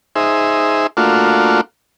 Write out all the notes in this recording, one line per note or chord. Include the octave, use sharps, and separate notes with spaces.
D#4 G#4 C5 E5
A3 A#3 D4 F4 F#4